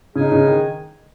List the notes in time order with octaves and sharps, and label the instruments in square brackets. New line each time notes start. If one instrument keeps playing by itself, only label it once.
[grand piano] C#3 [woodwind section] G#3 D#4 G#4
[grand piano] C#3
D#3